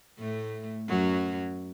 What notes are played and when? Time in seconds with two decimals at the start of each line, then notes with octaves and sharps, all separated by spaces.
0.19 A2 A3
0.89 F#2 F#3